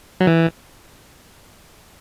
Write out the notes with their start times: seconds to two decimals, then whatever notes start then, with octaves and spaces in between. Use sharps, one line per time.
0.21 F#3
0.27 E3